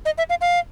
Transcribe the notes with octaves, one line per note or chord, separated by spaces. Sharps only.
D#5
E5
F5
F5